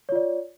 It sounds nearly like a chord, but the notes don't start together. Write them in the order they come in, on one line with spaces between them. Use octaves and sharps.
C#5 F4 D5